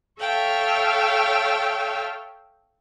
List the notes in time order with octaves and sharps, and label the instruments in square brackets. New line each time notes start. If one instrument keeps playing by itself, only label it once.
[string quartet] A4 C#5 E5 F5 G5